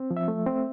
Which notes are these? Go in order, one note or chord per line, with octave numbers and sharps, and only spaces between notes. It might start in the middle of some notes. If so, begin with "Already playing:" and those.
Already playing: C4
F3
E5
A3
C4